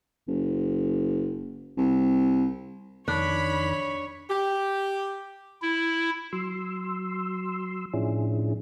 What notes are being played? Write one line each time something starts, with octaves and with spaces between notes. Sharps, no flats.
F#1
C2
F2 D#3 D4 C#5 B5
G4
E4
F#3 C6 E6
A2 F3 C#4 D4 E4 G#4